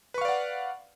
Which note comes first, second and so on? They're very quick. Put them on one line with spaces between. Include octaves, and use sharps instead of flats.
B4 C#6 F5 D5 F#5